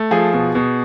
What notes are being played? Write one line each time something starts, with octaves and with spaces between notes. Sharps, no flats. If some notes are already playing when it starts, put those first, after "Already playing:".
Already playing: A3
F3 G#4
B2
B2